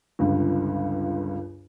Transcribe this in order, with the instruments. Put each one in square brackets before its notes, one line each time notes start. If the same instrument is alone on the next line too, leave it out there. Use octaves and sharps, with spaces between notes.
[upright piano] G1 C#2 G2